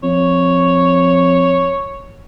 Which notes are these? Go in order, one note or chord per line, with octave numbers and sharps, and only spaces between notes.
F2 C#5